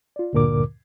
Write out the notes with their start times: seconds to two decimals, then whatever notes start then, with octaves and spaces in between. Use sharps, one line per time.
0.16 F4 D5
0.33 D2 G2 A#2 D3 A#4 D6